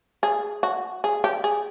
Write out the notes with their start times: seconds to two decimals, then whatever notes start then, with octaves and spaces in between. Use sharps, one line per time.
0.23 G#4
0.63 F#4
1.04 G#4
1.24 G4
1.44 G#4